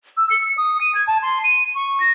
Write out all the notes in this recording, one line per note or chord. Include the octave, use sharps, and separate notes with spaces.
E6
C#7
D#6
D#7
G#6
A5
C6
D#7
C#6
A#6